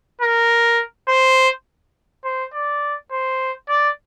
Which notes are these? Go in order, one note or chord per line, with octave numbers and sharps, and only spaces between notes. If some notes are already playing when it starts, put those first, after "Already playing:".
A#4
C5
C5
D5
C5
D5